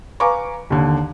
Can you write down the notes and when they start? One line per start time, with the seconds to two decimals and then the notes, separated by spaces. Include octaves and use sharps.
0.20 B4 F5 G#5 A#5 C#6 D6
0.70 D#2 D3